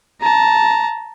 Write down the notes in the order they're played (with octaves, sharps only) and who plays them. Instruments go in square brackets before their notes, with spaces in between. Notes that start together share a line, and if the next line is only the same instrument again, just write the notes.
[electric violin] A5 A#5